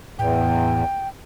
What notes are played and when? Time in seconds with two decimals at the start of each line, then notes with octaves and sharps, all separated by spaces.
0.19 E2 A2 G5